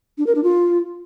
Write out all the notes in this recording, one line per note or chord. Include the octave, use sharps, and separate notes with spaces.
D4
A#4
D4
F4